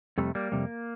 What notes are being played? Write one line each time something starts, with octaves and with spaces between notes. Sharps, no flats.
F2 C3 G3 A3
G3 A#3
F2 C3 G3